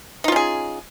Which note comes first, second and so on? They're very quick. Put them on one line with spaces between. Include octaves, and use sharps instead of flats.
D#4 F4 C#4 G#4